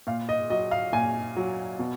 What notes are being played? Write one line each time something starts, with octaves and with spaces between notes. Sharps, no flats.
A#2 F5
D#5
F#3 D#5
F5
A#2 G#5
F#3
B2